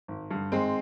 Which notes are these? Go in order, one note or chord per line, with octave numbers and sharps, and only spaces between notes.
G#1
G2 D3
G#1 G#3 C4